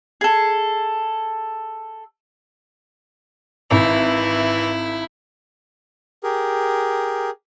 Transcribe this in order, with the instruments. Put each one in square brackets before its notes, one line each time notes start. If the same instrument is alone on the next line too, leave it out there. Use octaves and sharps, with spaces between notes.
[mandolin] G#4 A4
[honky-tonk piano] G#1 [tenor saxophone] E3 [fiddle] E4
[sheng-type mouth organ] G4 G#4 A#4